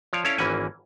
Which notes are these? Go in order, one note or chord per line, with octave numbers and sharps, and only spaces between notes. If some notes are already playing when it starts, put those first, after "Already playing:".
F3 C#5 D5 F5
C#4 E4 A4 C#5 D5 F5
G#1 E3 A#3 C#4 F#5 G#5